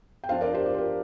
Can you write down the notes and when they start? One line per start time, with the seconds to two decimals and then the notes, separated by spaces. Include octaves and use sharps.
0.24 G5
0.29 F3 D4 F4 C5 F5
0.41 A#4 D5
0.53 G4 C5
0.66 G4
0.74 C5
0.78 A#4